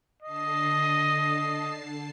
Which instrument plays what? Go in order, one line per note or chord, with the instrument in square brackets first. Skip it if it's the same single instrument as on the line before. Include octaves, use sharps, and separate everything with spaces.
[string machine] D3 A5 C7 [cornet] D#5